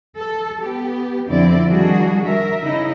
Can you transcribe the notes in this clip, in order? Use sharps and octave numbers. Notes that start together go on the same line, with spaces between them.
A4
B3 G4
F2 D3 F3 C4 E4 D5
D#3 G3 D4 F#4 G#4
A#4 E5
C#3 D#4 E4